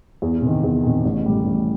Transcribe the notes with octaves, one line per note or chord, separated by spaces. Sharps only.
E2
C3 D#3
E2
C3 D#3
A1
A2 G3
A1